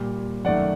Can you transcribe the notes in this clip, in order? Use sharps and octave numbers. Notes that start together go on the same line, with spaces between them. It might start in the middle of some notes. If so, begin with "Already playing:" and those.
Already playing: A#2 G3
F#2 D#3 A3 D5 F#5